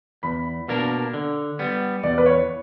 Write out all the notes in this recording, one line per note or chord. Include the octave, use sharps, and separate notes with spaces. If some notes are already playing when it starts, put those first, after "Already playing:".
E2 B5
B2 A#3 D4 A#4
D3
G3 B3
E2 D5
B4
C#5